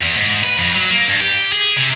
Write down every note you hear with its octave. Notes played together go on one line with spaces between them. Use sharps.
E2
G#2
B4
F2
F#3
A#3
G2
G4
G#4
C3